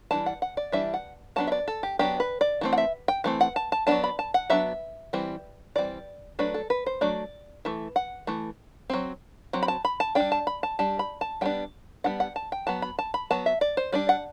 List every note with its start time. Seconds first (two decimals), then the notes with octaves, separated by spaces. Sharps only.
0.11 E3 G3 D4 A5
0.26 F#5
0.42 F#5
0.57 D5
0.72 E3 G3 D4 E5
0.94 F#5
1.36 F#3 B3 D4 A5
1.47 E5
1.52 D5
1.68 A4
1.83 G4
1.99 F#3 B3 D4 G4
2.20 B4
2.41 D5
2.61 E3 A3 C4
2.73 F#5
2.78 E5
3.08 G5
3.24 E3 A3 C4
3.41 F#5
3.56 A5
3.72 A5
3.87 F#3 B3 D4 A5
4.04 B5
4.19 A5
4.34 F#5
4.50 F#3 B3 D4 E5
5.13 E3 G3 C4
5.75 E3 G3 C4 D5
6.39 F#3 A3 D4 B4
6.54 A4
6.70 B4
6.86 C5
7.01 F#3 A3 D4 D5
7.65 E3 A3
7.96 F#5
8.27 E3 A3
8.90 F#3 C4
9.53 F#3 C4
9.63 B5
9.68 A5
9.85 B5
10.00 A5
10.15 G3 D4 G5
10.32 A5
10.47 B5
10.63 A5
10.79 G3 D4 A5
10.99 B5
11.21 A5
11.41 G3 B3 D4 G5
12.04 G3 B3 D4 F#5
12.20 F#5
12.36 A5
12.52 G5
12.67 F#3 B3 A5
12.82 B5
12.99 A5
13.14 B5
13.31 F#3 B3 A5
13.46 E5
13.61 D5
13.77 C5
13.92 G3 D4 D5
14.09 F#5